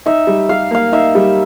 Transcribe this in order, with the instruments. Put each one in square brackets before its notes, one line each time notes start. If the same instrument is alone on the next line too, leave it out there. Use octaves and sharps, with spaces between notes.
[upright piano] D#4 [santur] E5
[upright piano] G3
[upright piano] G3 [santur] F5
[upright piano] A#3 [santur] F5
[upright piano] D#4 [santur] E5
[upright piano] G3